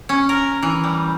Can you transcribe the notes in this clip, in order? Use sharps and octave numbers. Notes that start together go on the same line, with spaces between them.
C#4
A#4
E3
G3